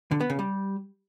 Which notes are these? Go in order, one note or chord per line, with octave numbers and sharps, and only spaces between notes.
D3
B3
C#3
G3